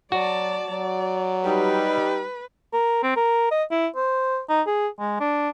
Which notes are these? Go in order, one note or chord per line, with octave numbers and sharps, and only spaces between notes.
F#3 F#4 D5 A5
F#3 D5
G3 D#4 B4
A#4
C4
A#4
D#5
E4
C5
D#4
G#4
G#3
D4